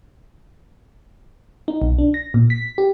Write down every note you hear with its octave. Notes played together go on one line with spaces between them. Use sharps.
D#4
B1
D4
A#6
A#2
B6
G4